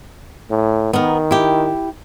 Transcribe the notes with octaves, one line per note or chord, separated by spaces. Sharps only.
A2
D#3 B3 A#4
E4 G4